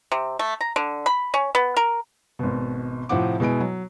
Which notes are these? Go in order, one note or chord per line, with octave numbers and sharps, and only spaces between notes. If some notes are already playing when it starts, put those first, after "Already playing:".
C3
A3
A#5
D3
B5
C#4
B3
A#4
G#1 B2
A2 C3 F3 C4 F#5 D6
B2 G#3 E4 G#5 D7
F#3